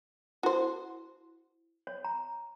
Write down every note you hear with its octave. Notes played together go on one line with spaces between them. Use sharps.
E4 F#4 C5
C#5
A#5